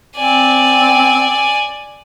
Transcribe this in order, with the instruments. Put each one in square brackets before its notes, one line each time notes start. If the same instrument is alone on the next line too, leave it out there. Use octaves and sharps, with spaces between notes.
[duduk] C4 [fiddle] D5 G#5